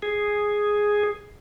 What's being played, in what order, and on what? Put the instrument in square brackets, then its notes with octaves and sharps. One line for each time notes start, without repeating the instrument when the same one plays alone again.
[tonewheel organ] G#4